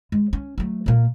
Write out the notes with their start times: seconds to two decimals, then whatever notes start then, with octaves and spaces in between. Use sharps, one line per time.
0.12 G#3
0.33 C#4
0.58 F#3 A3
0.86 A#2 A#3